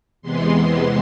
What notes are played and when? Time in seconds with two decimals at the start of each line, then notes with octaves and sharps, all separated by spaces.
0.22 E2 C3 E3 G#3 B3 C6